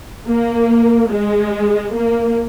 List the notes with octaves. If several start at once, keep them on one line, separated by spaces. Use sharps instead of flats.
A#3
G#3
A#3